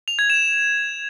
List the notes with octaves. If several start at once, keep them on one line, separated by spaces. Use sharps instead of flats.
F7
G#6
E7